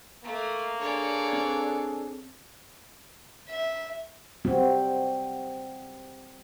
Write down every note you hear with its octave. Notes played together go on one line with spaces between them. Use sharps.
A3 A#3
D4 G#4 A4 C#5 D5
C4
E5
G3 C4 F#4